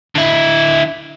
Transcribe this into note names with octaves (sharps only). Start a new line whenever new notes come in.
D3 E4